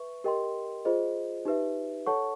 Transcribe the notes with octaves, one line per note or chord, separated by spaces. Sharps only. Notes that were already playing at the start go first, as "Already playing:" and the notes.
Already playing: B4 E5 C#6
G4 A#4 D#5 G5 C6
F4 G#4 C5 D#5
D#4 G4 B4 E5
A4 C#5 F#5 A5 C#6